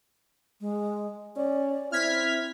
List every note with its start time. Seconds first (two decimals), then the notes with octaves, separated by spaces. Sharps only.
0.61 G#3
1.36 C#4 D5
1.92 C4 E4 F6 G#6 B6